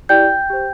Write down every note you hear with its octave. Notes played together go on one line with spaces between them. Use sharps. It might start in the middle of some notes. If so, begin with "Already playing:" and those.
E4 G4 D5 G5 G6
G4 C5